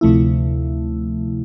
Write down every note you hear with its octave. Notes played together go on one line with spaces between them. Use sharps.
D2 C3 F3 A3 E4